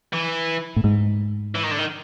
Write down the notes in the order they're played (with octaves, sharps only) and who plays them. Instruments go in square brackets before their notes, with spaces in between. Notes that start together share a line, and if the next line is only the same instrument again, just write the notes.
[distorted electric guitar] E3
[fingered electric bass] A2
G#2
[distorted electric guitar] E3
D#3
D3
D#3